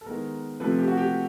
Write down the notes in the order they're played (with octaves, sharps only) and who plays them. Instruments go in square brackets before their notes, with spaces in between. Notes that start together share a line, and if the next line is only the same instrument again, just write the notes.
[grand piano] A4
D#3 G#3 B3 A#4
C3 F3 A3 C4 B4
G4
F#4
G4